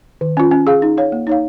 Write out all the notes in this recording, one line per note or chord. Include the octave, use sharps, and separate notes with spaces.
D#3
C#4 F4
C#4
G#4 F5
D#4
C#5 F5
A#3
D#4 C#5 F5